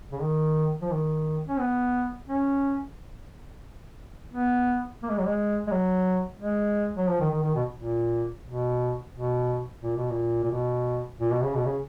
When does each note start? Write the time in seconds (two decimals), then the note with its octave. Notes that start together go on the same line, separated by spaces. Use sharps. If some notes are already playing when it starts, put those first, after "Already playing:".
0.12 C#3
0.22 D#3
0.82 F3
0.91 D#3
1.48 C#4
1.59 B3
2.29 C#4
4.34 B3
5.03 A#3
5.10 G#3
5.18 F#3
5.25 G#3
5.67 G#3
5.71 F#3
6.40 G#3
6.97 F#3
7.09 F3
7.20 D#3
7.30 D#3
7.43 D#3
7.54 B2
7.77 A#2
8.46 B2
9.13 B2
9.83 A#2
9.97 B2
10.11 A#2
10.43 A#2
10.51 B2
11.20 A#2
11.32 B2
11.43 C#3
11.54 B2
11.65 C#3